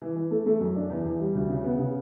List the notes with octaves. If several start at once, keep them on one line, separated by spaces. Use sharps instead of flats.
E3
E3
A3
A3
F#2
D4
E2
E2
G3
D2
C#3
B3
C#3